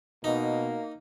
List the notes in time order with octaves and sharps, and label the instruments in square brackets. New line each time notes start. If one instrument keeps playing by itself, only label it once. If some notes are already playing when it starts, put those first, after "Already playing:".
[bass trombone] B2 [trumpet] A#3 [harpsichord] D#4